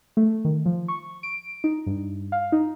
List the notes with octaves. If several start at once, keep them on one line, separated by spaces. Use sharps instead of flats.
A3
D#3
F3
C#6
D7
D#4
G2
F5
D#4